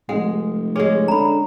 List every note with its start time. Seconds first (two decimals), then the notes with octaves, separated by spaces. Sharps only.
0.09 F1 G#3 F#5
0.76 G#3 C#4 G#4
1.08 D3 A#5 B5